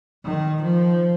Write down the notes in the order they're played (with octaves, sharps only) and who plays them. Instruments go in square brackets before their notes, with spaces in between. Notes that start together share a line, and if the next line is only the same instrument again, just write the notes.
[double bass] D#3
F3